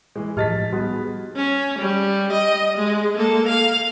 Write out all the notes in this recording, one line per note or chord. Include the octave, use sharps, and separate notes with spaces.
E3 G#3
A2 F3 G4 D#5 A5 F6 A6 B6
G3 B3 D#4 F#4 G#4
C#4
G3
D#5
G#3
A#3 A4
F5